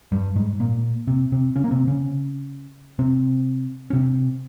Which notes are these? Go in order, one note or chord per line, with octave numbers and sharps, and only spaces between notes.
G2 G3
G#2 G#3
A#2 A#3
C3 C4
C3 C4
C#3 C#4
A#3
C3 C4
C#3 C#4
C3 C4
C#4
C3 C4